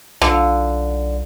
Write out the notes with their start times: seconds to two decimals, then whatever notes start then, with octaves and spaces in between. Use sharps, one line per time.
0.22 B1 D3 F4